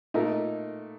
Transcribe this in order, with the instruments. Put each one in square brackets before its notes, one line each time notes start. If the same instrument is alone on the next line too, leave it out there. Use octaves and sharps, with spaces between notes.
[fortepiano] A#2 A3 D#4 A#4